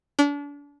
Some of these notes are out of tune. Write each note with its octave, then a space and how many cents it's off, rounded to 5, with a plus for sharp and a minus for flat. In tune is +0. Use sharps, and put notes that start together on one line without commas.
D4 -35